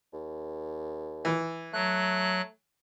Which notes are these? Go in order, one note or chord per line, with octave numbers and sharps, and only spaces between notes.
D#2
E3
F#3 A3 F#6